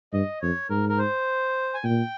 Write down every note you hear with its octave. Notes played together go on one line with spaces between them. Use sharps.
G2 D#5
F2 C#5
G#2 A#4
A#4
C5
G#5
A#2 G5